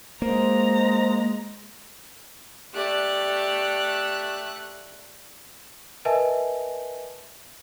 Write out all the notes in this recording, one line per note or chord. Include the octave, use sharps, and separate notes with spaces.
G#3 A#3 C5 A#5
A3 G4 D5 F#6
A#4 B4 D#5 E5 G#5 A5